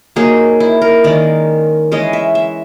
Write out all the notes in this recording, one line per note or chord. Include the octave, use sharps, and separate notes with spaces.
F#3 A#3 D#4 G#4
E4
A#4
D#3 G#3 C#4 D5
E3 G#3 C#4 D#5
E5
E5